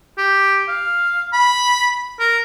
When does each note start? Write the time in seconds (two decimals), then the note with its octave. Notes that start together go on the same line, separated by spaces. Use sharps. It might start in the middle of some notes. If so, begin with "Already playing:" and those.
0.18 G4
0.68 F5
1.33 B5
2.19 A#4